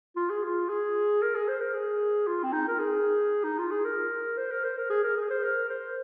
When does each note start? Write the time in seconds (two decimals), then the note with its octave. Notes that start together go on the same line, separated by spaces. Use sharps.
0.16 F4
0.30 G#4
0.44 F4
0.69 G#4
1.22 A#4
1.35 G#4
1.48 C5
1.61 A#4
1.74 G#4
2.27 F4
2.43 C4
2.53 D#4
2.68 A#4
2.79 G#4
3.44 D#4
3.58 F4
3.71 G#4
3.85 A#4
4.37 C5
4.51 A#4
4.64 C5
4.78 A#4
4.90 G#4
5.03 A#4
5.17 G#4
5.30 C5
5.43 A#4
5.69 C5